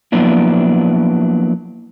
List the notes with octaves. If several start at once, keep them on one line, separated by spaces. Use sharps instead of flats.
F3 F#3 A#3 B3 D4 E4